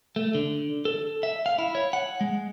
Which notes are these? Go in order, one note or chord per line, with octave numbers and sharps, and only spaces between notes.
A3
D3
A4
E5
F5
E4
C#5
F#5
G#3